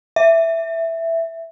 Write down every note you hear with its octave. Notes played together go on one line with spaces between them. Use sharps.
E5